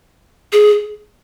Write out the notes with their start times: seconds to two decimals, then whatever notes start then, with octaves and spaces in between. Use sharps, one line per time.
0.53 G#4